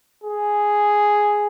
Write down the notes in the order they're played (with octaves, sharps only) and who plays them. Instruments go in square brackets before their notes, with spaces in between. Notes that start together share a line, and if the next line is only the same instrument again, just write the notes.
[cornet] G#4